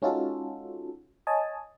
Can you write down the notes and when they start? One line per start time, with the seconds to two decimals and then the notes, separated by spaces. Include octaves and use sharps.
0.02 G#3 C#4 D#4 F4 F#4 A4
1.27 C#5 D#5 G#5 A5